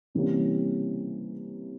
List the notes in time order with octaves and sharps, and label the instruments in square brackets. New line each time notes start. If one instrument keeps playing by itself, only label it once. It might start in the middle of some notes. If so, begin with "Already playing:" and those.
[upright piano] C3 E3 G3 A#3 C#4